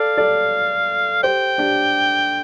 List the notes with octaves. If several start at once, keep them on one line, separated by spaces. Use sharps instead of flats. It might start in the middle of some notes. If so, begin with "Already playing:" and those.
Already playing: A4 D5 F5
A4 D5
G4 C5 G5
D4 G4